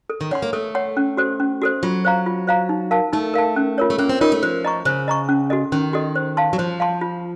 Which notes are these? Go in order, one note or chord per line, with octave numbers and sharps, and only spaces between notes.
A4
D#3
C#4 C#5 F#5 C6
A#3
A3 A4
C#5 F#5 C6
C#4
F#4 A4 C5
C#4
F#4 A4 C5
F#3 F4
C5 F5 A#5
F4
C5 F5 A#5
D#4
A#4 F5 A5
A3 D#4
A#4 F5 A5
C#4
F4 A#4 C#5
A3
A#3 C#4
C4
D#4 F4 A#4 C#5
A3
F3 C5
D#5 A#5 C#6
C#3 C5
D#5 A#5 C#6
C#4
F#4 A4 D#5
D#3 C#4
F#4 A4 D#5
C5
F5 A5 C6
F#3
F3 C5
F5 A5 C6
F4